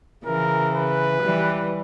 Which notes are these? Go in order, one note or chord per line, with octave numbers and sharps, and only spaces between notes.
C#3 E3 A#4
B4
E3 G3